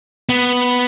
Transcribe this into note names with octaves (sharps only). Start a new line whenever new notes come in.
B3